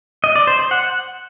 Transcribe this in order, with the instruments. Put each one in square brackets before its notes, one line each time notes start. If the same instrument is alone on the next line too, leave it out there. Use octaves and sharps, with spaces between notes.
[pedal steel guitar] D#5
D5
C5
C5
F#5